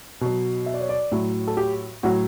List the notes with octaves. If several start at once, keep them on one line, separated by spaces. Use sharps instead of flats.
B2 F#3
E5
D5
C#5
D5
A2 F#3
A4
G4
A2 F#3 F#4